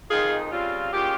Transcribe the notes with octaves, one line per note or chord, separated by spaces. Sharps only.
F2 D#3 G#3 D#4 F4 G#4
C#3 G3 C4 F4
A#2 G#3 C#4 F4 G4